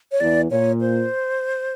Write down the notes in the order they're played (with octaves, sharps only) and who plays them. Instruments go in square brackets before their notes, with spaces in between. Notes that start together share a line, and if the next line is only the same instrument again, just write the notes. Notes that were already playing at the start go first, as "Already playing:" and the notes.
[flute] C#5
[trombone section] E2 [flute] D5
[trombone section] A#2 [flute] C#5
[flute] C5